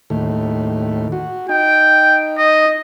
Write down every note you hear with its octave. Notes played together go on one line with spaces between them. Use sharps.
D#2 A2
F#4
D#4 G5
D#5